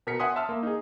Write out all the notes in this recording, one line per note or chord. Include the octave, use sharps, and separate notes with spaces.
B2 A#4 B6 C#7
E5 F#5 G#5 C6 D#6
E5 A5 C6 E6 F6
A#3
D#4 G#4